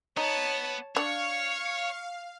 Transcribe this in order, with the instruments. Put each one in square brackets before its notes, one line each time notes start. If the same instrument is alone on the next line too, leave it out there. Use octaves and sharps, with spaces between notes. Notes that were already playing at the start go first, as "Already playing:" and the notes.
[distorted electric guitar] B3 [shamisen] D#4 [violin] C#5 A5
[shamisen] D4 [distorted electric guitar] C#5 [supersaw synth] F5 [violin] C#6